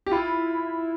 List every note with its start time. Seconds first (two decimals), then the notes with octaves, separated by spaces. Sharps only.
0.06 G4
0.12 E4 F4